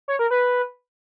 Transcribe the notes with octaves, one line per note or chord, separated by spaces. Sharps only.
C#5
A#4
B4